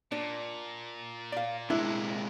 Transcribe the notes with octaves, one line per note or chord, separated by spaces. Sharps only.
A#2 D4
D5 F5
C3 G#3 D4 E4